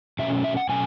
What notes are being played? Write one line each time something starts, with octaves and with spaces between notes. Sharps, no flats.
B2 F#3 A3 C#4 E5
E5
F#5
B2 F#3 A3 C#4 G#5